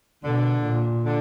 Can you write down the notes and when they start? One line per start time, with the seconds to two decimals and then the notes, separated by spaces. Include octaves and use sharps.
0.24 B2 D3
0.64 A#2
1.04 D3